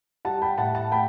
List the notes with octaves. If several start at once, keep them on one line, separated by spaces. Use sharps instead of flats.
G3 F#5 A5
G5 B5
A2 F#5 A5
F#5 A5
A3 G5 B5